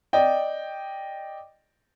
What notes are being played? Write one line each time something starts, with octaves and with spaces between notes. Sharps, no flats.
D5 D#5 G5